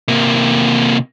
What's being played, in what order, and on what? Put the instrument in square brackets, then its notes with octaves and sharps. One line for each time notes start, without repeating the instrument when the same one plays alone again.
[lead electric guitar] C3 A#3